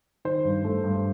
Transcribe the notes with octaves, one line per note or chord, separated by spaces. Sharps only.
D#3 C5
G2
A3
G2